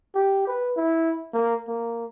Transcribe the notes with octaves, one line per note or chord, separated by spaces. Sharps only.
G4
B4
E4
A#3
A#3